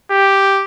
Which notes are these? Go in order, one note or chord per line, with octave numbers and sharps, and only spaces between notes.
G4